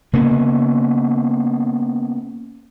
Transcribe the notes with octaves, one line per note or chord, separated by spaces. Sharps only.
C#3 A#3 B3